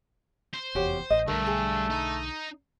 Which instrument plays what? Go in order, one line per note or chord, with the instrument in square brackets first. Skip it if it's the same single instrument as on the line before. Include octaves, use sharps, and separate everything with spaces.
[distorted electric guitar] C5
[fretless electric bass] F1 E2 [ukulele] F#4 G4 C#5
[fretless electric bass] A1 [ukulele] D#5
[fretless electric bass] B1 D3 [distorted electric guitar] G2 [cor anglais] A3 [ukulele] A#4
[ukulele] G#4
[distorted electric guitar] D#4